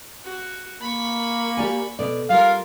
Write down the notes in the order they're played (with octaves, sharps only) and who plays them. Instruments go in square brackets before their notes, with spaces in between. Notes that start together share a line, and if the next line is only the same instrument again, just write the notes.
[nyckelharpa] F#4
[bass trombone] A#3 [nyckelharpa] B5 C#6
[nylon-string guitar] G4 D5 G#5
B2 A4 D5
[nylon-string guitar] G3 [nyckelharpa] F4 A#4 [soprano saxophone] F5